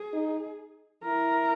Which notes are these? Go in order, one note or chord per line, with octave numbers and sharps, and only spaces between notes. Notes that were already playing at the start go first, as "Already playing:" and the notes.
Already playing: G#4
D#4
E4 A#4